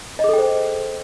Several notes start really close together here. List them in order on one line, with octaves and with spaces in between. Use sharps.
D#5 G#4 A4 G5 C5